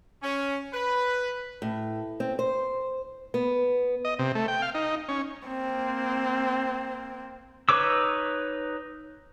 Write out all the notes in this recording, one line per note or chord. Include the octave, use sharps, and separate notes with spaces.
C#4
B4
A2
C4
C5
B3
D#5
C3
A3
G5
F5
D#4
C#4
A#3 C4
D#4 B4 C#5 D6 E6